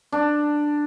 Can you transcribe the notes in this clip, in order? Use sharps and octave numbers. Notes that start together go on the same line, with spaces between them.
D4